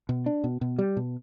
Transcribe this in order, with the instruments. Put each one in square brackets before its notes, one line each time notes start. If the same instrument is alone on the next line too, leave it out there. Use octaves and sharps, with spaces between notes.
[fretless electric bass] B2
D4
B2
B2
G3
B2